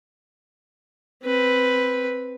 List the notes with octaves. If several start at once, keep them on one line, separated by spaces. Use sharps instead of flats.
C4 B4